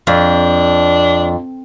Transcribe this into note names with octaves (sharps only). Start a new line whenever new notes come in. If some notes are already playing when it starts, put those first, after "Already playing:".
F2 D4